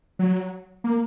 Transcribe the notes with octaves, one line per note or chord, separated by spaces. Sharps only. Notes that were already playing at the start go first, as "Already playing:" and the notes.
F#3
A#3